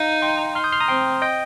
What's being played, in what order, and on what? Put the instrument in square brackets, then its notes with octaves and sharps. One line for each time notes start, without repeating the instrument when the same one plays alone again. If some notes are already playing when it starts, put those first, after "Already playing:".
Already playing: [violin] D#4 [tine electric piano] F5 A#5
[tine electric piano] G5 C6
C6 F6
D#6 G6
C6 F6
A#5 D#6
[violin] C4 [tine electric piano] G5 C6
[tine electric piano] D#5 G5